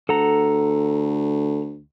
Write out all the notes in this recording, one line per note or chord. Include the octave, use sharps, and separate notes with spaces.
D2 A4 F#5 A#5